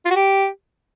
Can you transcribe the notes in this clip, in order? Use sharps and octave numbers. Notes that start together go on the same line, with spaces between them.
F4
F#4
G4